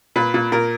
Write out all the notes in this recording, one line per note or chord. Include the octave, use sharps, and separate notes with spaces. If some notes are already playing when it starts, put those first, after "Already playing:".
A#2 B4
A#2
A#2 A#4